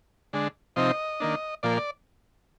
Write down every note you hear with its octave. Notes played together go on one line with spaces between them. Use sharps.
D3 G#3 D4
C3 F3 C4 D#4 D#5
D#3 A#3 D4
A#2 F3 A#3 D5
D5